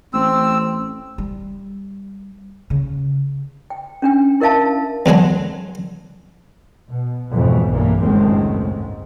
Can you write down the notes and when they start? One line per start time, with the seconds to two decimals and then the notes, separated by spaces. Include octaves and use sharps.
0.13 A1 C4 E6
1.18 G3
2.70 C#3
3.70 G5
4.02 C#4 D4 G5
4.40 E4 A#4 E5 F5 A5
5.06 E2 D3 F#3 G#3 D4
6.90 B2
7.33 F2 G#2 B2 E3 F#3
7.70 B1 G2 E3 A#3
8.01 F#1 C#2 A2 D#3 G#3 C4
8.63 G#2